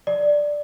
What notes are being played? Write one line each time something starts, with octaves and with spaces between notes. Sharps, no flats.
D5